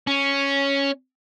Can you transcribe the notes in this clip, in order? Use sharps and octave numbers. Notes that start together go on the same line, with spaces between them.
C#4